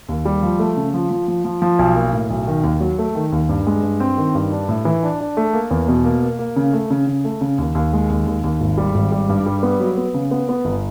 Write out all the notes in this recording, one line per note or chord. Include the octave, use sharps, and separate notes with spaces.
D#2
G3
F3
A3
C#3
F3
F3
F3
F3
F3
B1
A#3
A2
B1
D#3
D#2
F#3
A3
D#3
D#2
G2
G#3
G2
C4
D#3
G2
D4
A2
E3
D4
D4
A3
A#3
E2
B2
A#3
A#3
A#3
C#3
A3
C#3
C#3
A3
C#3
D#2
D#2
G#3
D#2
D#2
D#2
G#1
G3
G#1
G3
G2
G3
B3
F#3
B3
C#3
B3
B3
G1